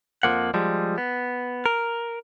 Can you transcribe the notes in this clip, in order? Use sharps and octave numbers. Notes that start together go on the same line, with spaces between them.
F2 C#3 F3 A#3 F#5
F3 G3 G#3
B3
A#4